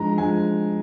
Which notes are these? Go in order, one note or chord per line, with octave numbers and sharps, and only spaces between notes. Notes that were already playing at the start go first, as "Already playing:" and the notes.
Already playing: G2 F3 G#3 A#5
G2 F3 G#3 G#5